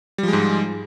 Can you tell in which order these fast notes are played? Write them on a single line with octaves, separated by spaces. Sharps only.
G3 F3 G#3 G#2